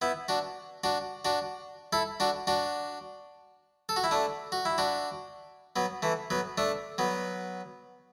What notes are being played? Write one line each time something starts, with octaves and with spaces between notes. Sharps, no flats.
B3 E4
D4 F#4
D4 F#4
D4 F#4
E4 A4
D4 F#4
D4 F#4
A4
F#4
E4
A3 D4
F#4
E4
D4 F#4
F#3 B3
E3 A3
F#3 B3
A3 D4
F#3 B3